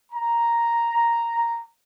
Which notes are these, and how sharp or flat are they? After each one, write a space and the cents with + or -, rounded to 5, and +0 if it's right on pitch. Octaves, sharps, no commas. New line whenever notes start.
A#5 +0